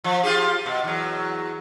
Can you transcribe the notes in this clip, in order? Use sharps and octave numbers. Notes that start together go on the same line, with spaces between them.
F3
F4 G4 G#4
B2
E2 F#3